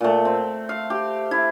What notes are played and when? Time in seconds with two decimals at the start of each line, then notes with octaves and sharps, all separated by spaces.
0.01 A#2 A3
0.25 C4
0.69 F5
0.90 G4
1.31 E4